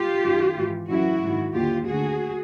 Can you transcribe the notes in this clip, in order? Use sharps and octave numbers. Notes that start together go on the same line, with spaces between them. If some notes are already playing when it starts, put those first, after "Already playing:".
Already playing: F4 G4
F#2 D#3
G#2 E3
F#2 C#3 E3 E4 F#4
G#2 D#3
D#2 D3 F4 G4
D2 D3 F#4 G#4